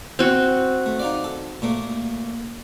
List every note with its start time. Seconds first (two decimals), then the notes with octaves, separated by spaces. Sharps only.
0.19 C4 F#4
0.86 A3
1.00 D#4 F4 D5
1.24 A4
1.62 A#2 A3 A#3